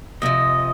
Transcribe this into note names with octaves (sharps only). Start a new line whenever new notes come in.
F2 C3 F3 D#5